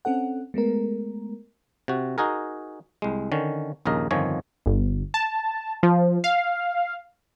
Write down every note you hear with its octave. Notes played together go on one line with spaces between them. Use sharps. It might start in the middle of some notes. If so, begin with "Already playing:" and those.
C4 C#4 A4 F#5
G#3 A3 B3 A#4
C3 F#4
D#4 F#4 G#4 A#4
C2 G#3
D3 D#3 C#4
A#1 D#2 C#3 A#4 D#5
G1 F2 D#3 F3 C#5 G#5
G1
A5
F3
F5